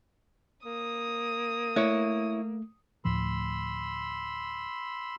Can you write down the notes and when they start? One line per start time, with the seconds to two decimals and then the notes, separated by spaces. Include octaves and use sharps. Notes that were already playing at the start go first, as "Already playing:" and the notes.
0.65 A#3 D#6
1.76 A3 E4 C#5
3.05 D2 A2 F3 B5 C6 E6